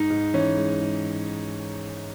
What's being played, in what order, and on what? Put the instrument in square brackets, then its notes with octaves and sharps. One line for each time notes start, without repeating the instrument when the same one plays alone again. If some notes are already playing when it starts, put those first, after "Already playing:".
Already playing: [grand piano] G#2 D#4
G#2
E3 C#4
G#3
G#2